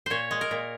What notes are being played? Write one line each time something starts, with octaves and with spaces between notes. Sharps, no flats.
A#2 C5 C#5
G#3
A#4
A#2